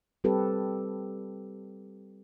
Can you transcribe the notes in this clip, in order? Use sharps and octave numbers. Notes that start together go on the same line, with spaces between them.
G3 C4 G4 A4 B4